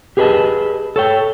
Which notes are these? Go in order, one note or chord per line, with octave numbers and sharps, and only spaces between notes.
G4 G#4 B4 D5 D#5 A5
A4 C#5 G5